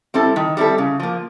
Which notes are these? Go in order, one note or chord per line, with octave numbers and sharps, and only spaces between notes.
G3 C4 E4 A4
D#3
G3 C4 E4 A4
C#3
F3 A#3